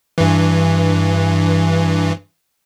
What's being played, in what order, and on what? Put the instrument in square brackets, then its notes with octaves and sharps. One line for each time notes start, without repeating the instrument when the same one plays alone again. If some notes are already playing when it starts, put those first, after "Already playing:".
[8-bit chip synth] G2 E3